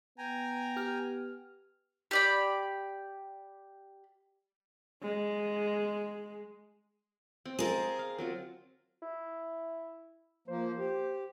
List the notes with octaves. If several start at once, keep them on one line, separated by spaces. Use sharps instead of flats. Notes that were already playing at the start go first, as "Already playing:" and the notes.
B3 G5 G#5 A#5
G4 F6
G4 D5 B5
G#3
C4
G#4 A#4 D#5 F5 A5
F5
F#3 C4 F4
E4
F3 A#3 C5
G4